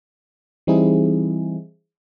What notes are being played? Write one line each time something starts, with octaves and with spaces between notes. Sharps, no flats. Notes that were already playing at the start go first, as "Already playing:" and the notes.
E3 G3 C4 D#4 E4 G#4